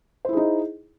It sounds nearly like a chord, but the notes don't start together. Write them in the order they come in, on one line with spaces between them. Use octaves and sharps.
C5 E4 G#4 D#4